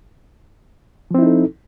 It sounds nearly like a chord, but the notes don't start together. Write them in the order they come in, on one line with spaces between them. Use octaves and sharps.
F3 C4 E4 D#4 A4